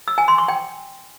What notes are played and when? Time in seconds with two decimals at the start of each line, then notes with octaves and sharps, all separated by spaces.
0.08 E6
0.18 G#5
0.28 C6
0.38 C#6
0.48 G5